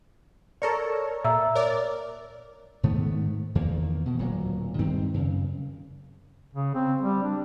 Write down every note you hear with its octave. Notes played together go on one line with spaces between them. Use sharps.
A4 A#4 C#5 D5
A#2 E5 A#5 E6
A#4 C#5 D5
G#2 D#3 A3 B3
E2 D#3 A#3
B2
D1 A#2 F#3
G2 D#3 C4
F#2 C#3
C#3
C4
G3
D4